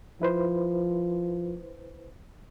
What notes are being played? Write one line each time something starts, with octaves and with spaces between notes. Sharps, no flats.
F3 E4 B4 C5